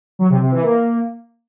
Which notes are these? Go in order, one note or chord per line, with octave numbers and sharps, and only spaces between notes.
F#3
C3
C3
E3
A#3